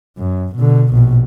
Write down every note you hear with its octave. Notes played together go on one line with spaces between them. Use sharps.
F#2
B2 D3
A#1 B2